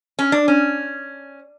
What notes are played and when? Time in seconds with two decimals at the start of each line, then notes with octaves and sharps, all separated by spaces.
0.19 C#4
0.32 D4
0.48 C#4